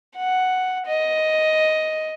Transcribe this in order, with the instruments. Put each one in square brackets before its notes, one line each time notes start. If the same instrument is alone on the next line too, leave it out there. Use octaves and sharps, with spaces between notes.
[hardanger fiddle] F#5
D#5